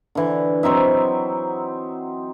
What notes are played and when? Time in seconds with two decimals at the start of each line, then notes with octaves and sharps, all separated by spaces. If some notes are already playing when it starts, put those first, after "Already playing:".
0.15 D3 E3
0.63 F#3 C4 D#4 E5